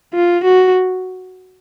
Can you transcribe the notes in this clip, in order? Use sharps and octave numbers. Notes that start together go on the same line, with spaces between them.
F4
F#4